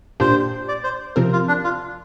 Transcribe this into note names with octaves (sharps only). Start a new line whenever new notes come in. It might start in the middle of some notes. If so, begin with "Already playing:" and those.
A#2 A#3 D4 G4 C5
D5
C5
C3 F3 C4 A#4
F4
D4
F4